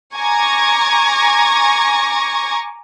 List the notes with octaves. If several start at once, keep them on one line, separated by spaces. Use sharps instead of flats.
G#5 A#5 C#6 D6 G#6 A#6